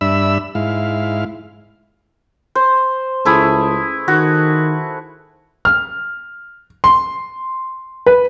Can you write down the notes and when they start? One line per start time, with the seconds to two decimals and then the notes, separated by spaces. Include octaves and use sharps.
0.01 G2 D4 E5 B5 E6
0.55 G#2 E4 F5
2.55 C5
3.25 C#2 A3 E4 G#4
4.08 D#3 F#4
5.65 F6
6.84 C6
8.06 B4